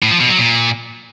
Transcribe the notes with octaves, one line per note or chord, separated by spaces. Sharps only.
A2
F3
B2
F#3
A#2